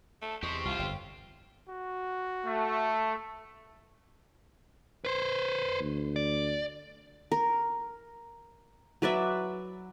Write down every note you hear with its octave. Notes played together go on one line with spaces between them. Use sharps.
A3 A5
E2 G#3 G4 C5 C#6
C2 F4
G1 F2 G5
F#4
A3
B4 C5
D2
D5
A#4
F#3 B4 D5 E5